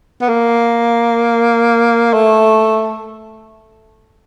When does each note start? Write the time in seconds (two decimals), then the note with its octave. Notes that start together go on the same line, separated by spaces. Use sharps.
0.22 B3
0.29 A#3
2.13 A3